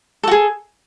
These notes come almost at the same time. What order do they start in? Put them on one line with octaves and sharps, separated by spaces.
A4 F#4 G#4